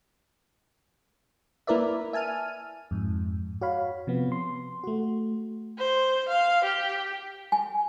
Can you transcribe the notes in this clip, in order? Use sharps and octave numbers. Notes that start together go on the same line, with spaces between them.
A#3 E4 A#4 B4 D5 E5
E5 G#5 A5 F6 D#7
F2 G#2
F#4 C#5 F5 B5
C3 F3 B3
C6
A3 F#4
C5
F5
G4
G#5